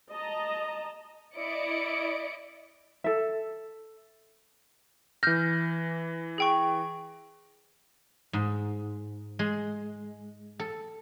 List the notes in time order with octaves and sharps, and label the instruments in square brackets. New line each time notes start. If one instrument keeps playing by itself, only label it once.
[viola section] D#5 A5 A#5
[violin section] E4 D5 D#5 C#7 D7
[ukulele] A4 E5
[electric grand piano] E3 A#6 [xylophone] F6 G6
[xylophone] G#4 G5 C#6
[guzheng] G#2
G#3
A4